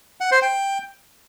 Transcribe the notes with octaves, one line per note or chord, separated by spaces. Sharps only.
F#5
C5
G5